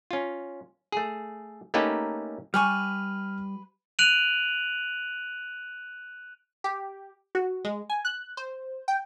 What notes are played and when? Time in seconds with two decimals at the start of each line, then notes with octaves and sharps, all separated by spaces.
0.11 C#4 F4
0.92 A3 G#4
1.74 A3 A#3 C#4 D#4 G4 B4
2.54 G3 B4 G#5 C#6 F6
3.99 F#6 D7 D#7 F7 F#7
6.64 G4
7.35 F#4
7.65 G#3
7.90 G#5
8.05 F#6
8.37 C5
8.88 G5